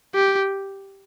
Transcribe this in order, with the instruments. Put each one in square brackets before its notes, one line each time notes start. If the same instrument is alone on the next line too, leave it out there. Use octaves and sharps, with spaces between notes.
[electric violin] G4